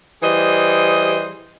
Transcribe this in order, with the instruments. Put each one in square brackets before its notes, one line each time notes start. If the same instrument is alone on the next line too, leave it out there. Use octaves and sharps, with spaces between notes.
[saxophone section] E3 G3 G#4 C5 D#5